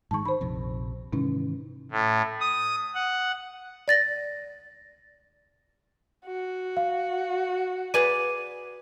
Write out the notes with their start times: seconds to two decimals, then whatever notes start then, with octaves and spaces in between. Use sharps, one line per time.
0.11 G#2 D#3 G#3 A5 C#6
0.26 D#3 C5 B5
0.41 A#1 F2 C3
1.13 G#2 C3 D#3 E3 C#4
1.92 A2
2.41 D#6
2.95 F#5
3.88 D5 A6 A#6
6.26 F#4
6.77 F5
7.94 G#4 B4 D5 D#7